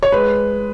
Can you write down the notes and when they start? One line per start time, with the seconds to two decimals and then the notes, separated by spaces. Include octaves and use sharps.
0.03 C#5
0.12 G#3 B4